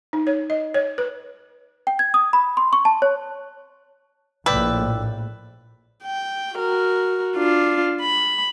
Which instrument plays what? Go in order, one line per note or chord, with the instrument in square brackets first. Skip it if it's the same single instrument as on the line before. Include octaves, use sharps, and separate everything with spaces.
[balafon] D#4
C#5
D#5
C#5
B4
[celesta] G5
G#6
D#6
B5
C6
C#6
A5
C#5
[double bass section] A#1 A2 [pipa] B4 [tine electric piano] D5 G5 E6
[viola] G5
F#4 A#4
D4 F4
B5